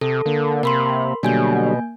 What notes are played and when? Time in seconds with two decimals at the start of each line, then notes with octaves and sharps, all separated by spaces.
0.01 C3 A4
0.26 D3 A#3
0.63 C3 A#4 B5 C6
1.23 B2 D3 F#3 G3 A#3 G#5 G6